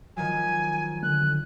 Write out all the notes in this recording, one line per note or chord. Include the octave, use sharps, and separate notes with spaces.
D#3 F3 F#3 G#5
D3 F#6